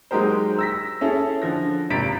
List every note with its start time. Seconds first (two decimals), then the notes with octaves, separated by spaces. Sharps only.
0.11 F#3 G#3 D#4 G4 A#4 C5
0.59 E6 A#6 B6
1.01 C#4 E4 G#4 A4
1.42 D3 F3 A#6
1.90 G#1 C3 A#5 A6 B6 D7